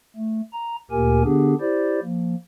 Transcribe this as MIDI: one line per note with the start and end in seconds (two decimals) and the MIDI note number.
0.16 0.41 57
0.53 0.76 82
0.91 1.23 38
0.91 1.23 46
0.91 1.23 58
0.91 1.23 67
0.91 1.23 70
0.91 1.23 80
1.24 1.54 50
1.24 1.54 59
1.24 1.54 62
1.24 1.54 67
1.24 1.54 68
1.60 2.00 64
1.60 2.00 67
1.60 2.00 72
1.60 2.00 74
2.02 2.35 53
2.02 2.35 58